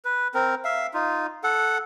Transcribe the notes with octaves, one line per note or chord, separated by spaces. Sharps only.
B4
C4 A#4
E5 F5
D#4 F4
A4 F#5